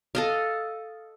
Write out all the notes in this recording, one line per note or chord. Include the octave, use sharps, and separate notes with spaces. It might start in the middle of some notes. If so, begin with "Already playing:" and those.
A4 D#5 F5